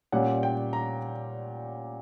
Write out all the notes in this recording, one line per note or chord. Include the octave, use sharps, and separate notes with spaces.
A#2 G3 C#4 F#5
G5
A#5